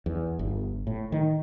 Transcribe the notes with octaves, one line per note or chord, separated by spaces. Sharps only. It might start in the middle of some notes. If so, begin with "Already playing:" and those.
E2
G1
A2
D#3